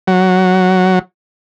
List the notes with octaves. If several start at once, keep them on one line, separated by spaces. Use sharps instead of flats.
F#3